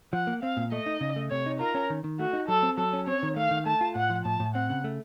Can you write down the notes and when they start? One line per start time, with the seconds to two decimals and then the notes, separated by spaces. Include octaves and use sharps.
0.13 F3 F#5
0.27 A#3
0.42 C4 F5
0.57 A#2
0.72 A3 D#5
0.86 D#4
1.01 C#3
1.16 A3
1.30 C3 C#5
1.46 D#4
1.60 F4 A#4
1.75 C#4
1.90 D#3
2.04 D#3
2.19 A3 F#4
2.33 D#4
2.48 F#3 A4
2.63 C4
2.78 F#3 A4
2.93 C#4
3.07 C4 C#5
3.23 D#3
3.36 A3 F5
3.51 D#3
3.66 A3 A5
3.81 F4
3.95 A2 F#5
4.10 F3
4.25 A2 A5
4.40 A2
4.55 C4 F#5
4.70 C#3
4.84 A3